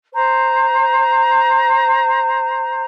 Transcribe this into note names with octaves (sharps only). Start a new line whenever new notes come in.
C5 A#5